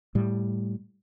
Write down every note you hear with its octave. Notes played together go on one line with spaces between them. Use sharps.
A2 G3